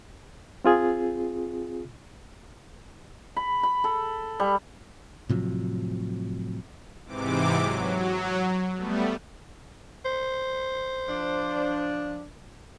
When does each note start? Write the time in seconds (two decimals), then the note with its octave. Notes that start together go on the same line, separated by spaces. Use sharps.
0.64 C4 F4 G#4
3.37 B5
3.63 B5
3.84 A4
4.40 G3
5.29 A2 C3 F3 F#3
7.06 G#2 C3 E3 D6
7.59 F#3
8.76 G3 A3 B3
10.05 C5
11.09 F3 D4